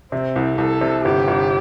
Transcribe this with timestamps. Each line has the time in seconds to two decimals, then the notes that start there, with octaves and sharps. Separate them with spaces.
0.12 C3 C4
0.36 C2
0.58 C2 A4
0.81 C3
1.05 G1 G4
1.28 G1